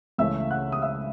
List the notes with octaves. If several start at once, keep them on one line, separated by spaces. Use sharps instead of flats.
C#2 C#3 E3 A3 C#4 E5 E6
F#5 F#6
D#6
E5 E6